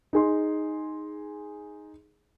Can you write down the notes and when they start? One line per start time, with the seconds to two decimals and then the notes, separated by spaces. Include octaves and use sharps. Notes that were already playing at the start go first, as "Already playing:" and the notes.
0.13 D#4 G#4 C6